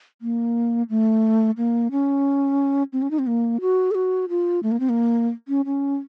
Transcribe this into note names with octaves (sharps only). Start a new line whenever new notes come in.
A#3
A3
A#3
C#4
C4
C#4
D#4
C4
A#3
F#4
A4
F#4
F4
A3
A#3
C4
A#3
C#4
C#4